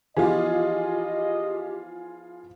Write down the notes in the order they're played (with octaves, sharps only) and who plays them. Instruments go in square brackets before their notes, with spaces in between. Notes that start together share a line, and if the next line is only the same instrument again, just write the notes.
[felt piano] E3 F3 B3 [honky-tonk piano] F4 G#4 [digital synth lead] G4 [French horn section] D#5